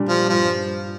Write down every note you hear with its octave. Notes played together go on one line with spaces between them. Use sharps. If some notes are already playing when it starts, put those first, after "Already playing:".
Already playing: A#2 G3 D4
F3
G2 F3